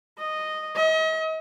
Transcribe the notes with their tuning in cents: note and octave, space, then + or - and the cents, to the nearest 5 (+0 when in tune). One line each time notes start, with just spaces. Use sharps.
D#5 -5
D#5 +40